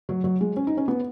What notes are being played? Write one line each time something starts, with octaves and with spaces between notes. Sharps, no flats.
F#3
F#3
G#3
C#4
D#4
C#4
B3